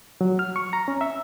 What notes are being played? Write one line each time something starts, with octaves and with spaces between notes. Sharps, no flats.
F#3
F6
C#6
A#5
C#4
E5